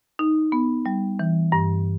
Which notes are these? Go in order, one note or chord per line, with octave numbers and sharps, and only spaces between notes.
D#4
B3
G3
E3
G2